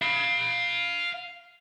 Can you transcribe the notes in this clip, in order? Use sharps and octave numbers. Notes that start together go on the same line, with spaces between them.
F5 B5